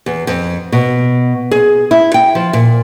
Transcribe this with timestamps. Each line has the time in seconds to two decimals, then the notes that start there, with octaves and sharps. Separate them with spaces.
0.06 E2
0.27 F2
0.72 B2
1.51 G#4
1.91 E4
2.14 G5
2.35 F3
2.53 A#2